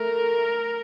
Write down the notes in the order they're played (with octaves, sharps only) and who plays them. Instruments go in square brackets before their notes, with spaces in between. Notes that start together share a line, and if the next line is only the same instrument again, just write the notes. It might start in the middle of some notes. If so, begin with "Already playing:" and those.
Already playing: [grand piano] A3 [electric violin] A#4